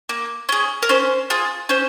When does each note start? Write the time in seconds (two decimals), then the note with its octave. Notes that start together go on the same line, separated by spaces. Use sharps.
0.09 A#3
0.49 C#4 G#4
0.83 A#4
0.89 C#4 C5
1.30 F4 G#4
1.69 C#4 C5